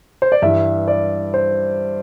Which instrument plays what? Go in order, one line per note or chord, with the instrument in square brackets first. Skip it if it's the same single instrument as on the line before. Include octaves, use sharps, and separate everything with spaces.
[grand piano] C5
D5
G2 E3 G3 E5
D5
C5